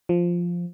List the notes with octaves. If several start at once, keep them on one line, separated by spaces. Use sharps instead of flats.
F3